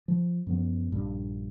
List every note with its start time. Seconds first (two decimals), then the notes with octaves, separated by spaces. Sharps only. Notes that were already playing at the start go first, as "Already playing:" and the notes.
0.08 F3
0.47 F#2 F3 B3
0.92 A#1 G2